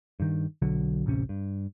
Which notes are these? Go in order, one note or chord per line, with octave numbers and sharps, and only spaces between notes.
G2 D#3
B1 D3 F#3
D1 A1 C3 C#4
G2